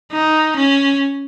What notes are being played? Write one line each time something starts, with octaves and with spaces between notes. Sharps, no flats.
D#4
C#4